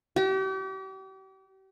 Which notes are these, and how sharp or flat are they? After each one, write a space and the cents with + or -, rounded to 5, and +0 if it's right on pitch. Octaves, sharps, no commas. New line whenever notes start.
G4 -40